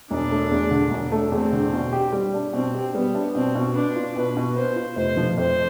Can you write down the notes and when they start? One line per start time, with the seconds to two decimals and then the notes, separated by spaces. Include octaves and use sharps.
0.10 E1 D4
0.31 A3
0.51 E2
0.71 D3
0.91 E1
1.12 A3
1.32 E2 C4
1.52 D3
1.73 B2
1.93 G4
2.13 G3
2.34 D4
2.53 B2 C4
2.75 G4
2.94 G3 B3
3.15 D4
3.35 B2 C4
3.55 B2
3.75 B3 D4
3.96 F4
4.16 B2 B4
4.37 B2
4.56 B3 C5
4.76 F4
4.96 F1 C5
5.17 F3
5.37 F2 C5